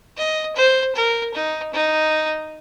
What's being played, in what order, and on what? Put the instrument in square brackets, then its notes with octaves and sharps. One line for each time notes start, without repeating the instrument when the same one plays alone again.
[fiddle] D#5
C5
A#4
D#4
D#4